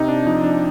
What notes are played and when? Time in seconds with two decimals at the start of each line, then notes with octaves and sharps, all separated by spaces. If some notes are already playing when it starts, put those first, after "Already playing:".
Already playing: C3 D#4
0.08 D4
0.26 F3 D#4
0.44 D4